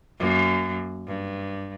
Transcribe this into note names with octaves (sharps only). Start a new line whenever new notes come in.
F#2 A#3
G2